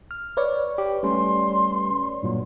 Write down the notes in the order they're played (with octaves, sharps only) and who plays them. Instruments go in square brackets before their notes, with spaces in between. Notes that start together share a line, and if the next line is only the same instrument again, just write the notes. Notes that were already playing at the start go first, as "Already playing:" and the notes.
[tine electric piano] F6
[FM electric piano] B4 C#5 D5
[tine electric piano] G4
[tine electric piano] G3 A3 C#4 [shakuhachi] C6
[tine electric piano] G2 A#2 F#3